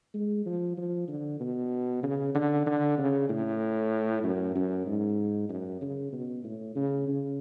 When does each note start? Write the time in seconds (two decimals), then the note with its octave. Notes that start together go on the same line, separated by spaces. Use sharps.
0.14 G#3
0.46 F3
0.78 F3
1.08 D3
1.40 B2
2.03 C#3
2.35 D3
2.66 D3
2.98 C#3
3.29 A2
4.24 F#2
4.55 F#2
4.86 G#2
5.49 F#2
5.81 C#3
6.13 B2
6.44 A2
6.75 C#3
7.08 C#3